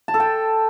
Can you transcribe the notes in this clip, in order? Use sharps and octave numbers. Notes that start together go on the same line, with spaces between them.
A5
A4
G5